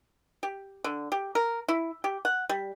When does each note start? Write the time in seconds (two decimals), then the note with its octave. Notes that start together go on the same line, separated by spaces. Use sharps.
0.43 G4
0.84 D3
1.12 G4
1.35 A#4
1.68 E4
2.04 G4
2.25 F#5
2.49 G3